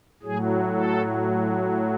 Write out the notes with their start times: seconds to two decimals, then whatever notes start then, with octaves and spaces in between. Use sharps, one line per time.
0.23 A2 F#3 G#4
0.72 A4